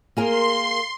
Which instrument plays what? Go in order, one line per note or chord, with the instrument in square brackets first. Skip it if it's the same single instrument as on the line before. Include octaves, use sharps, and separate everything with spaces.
[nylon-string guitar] A#3 G#4 A#4 [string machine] C6